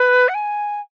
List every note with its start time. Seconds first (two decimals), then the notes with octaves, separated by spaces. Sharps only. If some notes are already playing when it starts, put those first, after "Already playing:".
Already playing: B4
0.28 F#5
0.34 G#5